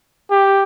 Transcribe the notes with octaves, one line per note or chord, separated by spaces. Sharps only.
G4